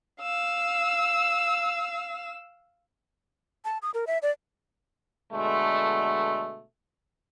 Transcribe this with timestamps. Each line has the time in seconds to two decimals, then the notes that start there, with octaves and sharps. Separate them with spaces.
0.21 F5 E6
3.65 A5
3.82 D#6
3.94 A#4
4.07 E5
4.22 D5
5.32 B2 D3 G#3 A3